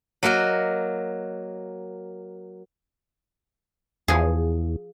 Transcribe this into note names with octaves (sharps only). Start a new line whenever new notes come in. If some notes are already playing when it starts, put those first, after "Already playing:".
F#3 A#3 F#4 A#4 D#5
E2 F3 G#4